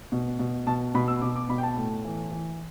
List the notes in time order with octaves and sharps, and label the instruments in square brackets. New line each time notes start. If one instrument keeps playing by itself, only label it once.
[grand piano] B2
B2
B2 A5
B2 B5
E6
B2 D6
D6
B2 B5
G5
A5
A2
E3
E3